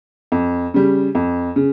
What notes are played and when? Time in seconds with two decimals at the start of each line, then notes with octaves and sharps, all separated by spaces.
0.32 F2
0.74 C#3 G3
1.15 F2
1.56 C#3